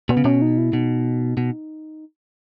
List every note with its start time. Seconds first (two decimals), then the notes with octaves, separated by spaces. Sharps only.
0.09 B2 B3
0.17 C#3
0.24 B2 C#4
0.42 D#4
0.58 E4
0.73 B2 D#4
1.37 B2